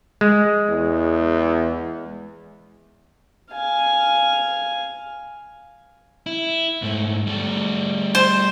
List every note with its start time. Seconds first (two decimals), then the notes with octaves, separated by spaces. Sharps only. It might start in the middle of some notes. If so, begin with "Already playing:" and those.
0.21 G#3
0.69 E2
3.52 F5 G#5
6.26 E4
6.82 G#2 A3
7.27 G3 A3
8.15 C5